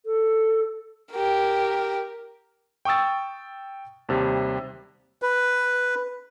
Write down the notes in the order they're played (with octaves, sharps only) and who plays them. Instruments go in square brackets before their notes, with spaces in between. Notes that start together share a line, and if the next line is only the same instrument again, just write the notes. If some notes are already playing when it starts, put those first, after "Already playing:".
[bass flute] A4
[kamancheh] G4 A#4
[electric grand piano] G5 C#6 D#6 E6 A6
D#2 C3 G3
[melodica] B4